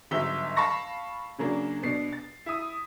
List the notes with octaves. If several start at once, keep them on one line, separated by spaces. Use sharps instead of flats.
G1 G#2 F#3 E5 G7
F5 A5 B5 C#6 A#6
C#3 F#3 A#3 D4
B2 D4 C7
A6
E4 D#6